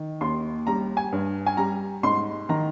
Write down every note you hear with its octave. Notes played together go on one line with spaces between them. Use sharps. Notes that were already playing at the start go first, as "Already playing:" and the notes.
Already playing: D#3
D#2 C6
G3 A#5
G#5
G2
G#5
G3 A#5
G#2 C6
D#3 A#5